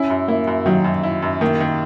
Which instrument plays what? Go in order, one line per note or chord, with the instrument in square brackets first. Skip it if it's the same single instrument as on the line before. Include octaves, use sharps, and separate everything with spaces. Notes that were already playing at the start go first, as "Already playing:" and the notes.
Already playing: [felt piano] C#4 [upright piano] E4
[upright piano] F#2
[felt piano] A#3 [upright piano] E4
[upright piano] F#2
[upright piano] D#3 [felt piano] F#3
[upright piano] F#2
E4
F#2
[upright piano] D#3 [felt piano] A#3
[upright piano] D#3